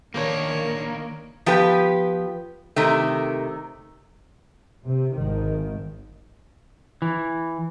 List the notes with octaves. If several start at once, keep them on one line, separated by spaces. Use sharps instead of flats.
D#3 A#3 D4 C#5
F3 B3 G4 B4
C3 D#3 A3
C3
G#1 D#3
E3